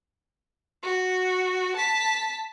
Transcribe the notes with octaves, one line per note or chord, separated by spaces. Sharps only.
F#4
A5 B6